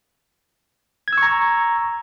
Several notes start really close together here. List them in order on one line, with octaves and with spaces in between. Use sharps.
G#6 E6 C#6 A#5